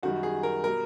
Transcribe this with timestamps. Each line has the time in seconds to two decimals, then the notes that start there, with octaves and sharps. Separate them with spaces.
0.03 F#2 D#3 G3 F#4
0.23 G#4
0.43 A#4
0.64 B2 G3 A#4